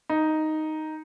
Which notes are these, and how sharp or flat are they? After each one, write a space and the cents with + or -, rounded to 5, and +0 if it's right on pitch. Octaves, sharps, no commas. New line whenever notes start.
D#4 +0